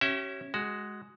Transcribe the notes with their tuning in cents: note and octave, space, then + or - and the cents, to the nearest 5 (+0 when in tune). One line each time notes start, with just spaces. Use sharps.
C#4 -10 G4 -45 E5 +0
G#3 +0 F#4 +10